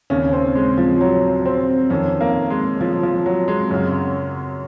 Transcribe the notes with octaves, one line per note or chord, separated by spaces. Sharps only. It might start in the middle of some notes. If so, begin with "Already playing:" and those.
D#2 C#3 C#4
C4
G#3
F3
F#3
C4
F2 D#3 C#4
A#3
G#3
F3
F3
F#3
G#3
F#2 C#3